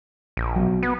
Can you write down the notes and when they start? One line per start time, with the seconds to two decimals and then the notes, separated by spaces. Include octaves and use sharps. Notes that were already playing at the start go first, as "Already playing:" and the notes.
0.37 A#1
0.56 B2 F#3
0.83 B3